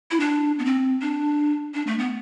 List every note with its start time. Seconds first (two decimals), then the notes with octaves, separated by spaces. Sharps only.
0.11 E4
0.20 D4
0.59 B3
0.65 C4
1.02 D4
1.74 D4
1.87 A3
1.99 B3